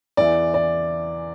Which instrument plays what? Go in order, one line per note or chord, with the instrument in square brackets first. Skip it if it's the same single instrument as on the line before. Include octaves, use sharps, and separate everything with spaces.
[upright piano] E2 E3 D5
D5